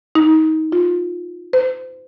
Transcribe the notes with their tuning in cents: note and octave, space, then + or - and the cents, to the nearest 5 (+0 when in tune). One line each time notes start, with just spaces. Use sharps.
D#4 +25
F4 +20
C5 -35